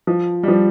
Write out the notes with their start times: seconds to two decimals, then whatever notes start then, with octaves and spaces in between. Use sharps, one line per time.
0.07 F3
0.43 G3
0.48 F3